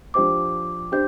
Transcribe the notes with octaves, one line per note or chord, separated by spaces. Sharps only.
F3 D4 G4 C5 D6
D4 G4 C5 G6